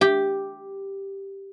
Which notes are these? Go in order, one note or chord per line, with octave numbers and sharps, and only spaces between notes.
G4